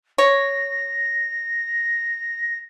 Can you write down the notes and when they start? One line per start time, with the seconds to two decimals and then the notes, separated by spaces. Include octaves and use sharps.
0.18 C#5 A#6